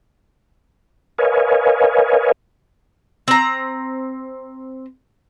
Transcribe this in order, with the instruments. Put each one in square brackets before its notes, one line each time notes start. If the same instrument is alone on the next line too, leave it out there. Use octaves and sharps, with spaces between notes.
[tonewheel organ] A#4 B4 C#5 D#5 F5 G#5
[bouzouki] C4 A#5